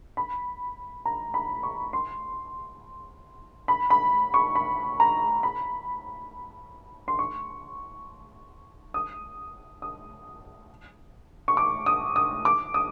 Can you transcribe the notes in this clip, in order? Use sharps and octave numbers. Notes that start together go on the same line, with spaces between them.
B5
A#5
B5
C#6
C6
B5
B5
C#6
B5
A#5
B5
C6
C#6
D#6
D#6
C#6
D6
D#6
D#6
D6
D#6